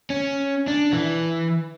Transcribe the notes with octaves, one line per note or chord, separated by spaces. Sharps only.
C#4
D4
E3